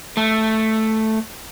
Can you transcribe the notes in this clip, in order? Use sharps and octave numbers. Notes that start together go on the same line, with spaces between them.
A3